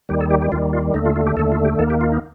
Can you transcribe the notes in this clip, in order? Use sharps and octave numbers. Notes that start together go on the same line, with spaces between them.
D#2 D#3 G3 G4
A4
G4
G4
D#2 D#3 G3 F4
F4
D#2 D3 A3 D#4
F4
F4
G4
D#2 D3 A3 A4
F4
G4
D#2 D#3 A#3 A4
G4
F4
D#4